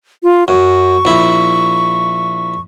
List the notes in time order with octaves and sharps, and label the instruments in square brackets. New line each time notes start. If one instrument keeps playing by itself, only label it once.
[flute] F4
[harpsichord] F#2 [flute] C#6
[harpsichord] A#1 E4